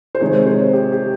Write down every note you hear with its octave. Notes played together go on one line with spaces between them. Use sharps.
C5
C3 D#3 G#3 C#5
C#5
C5
G4
G4